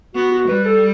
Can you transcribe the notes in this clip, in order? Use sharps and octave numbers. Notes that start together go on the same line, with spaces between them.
B3 F#4
F#4
G3 B4
A4